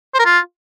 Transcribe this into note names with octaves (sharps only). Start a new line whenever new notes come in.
C5
A#4
F4